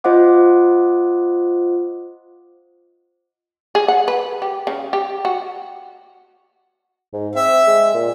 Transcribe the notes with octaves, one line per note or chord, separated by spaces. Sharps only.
F4 C5 D#5 F#5 D6
G#4
F#5
B4
G4
C#3
G4
F#4
G#2
C4 E5
G#3
A#2